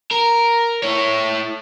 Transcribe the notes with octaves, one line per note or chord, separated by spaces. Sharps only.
A#4
E4 C#5